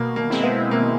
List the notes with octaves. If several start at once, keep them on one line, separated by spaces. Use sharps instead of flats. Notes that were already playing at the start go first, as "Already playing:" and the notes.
Already playing: B2 A#3
A#3
G#3 C4 E4
B3
B2 A#3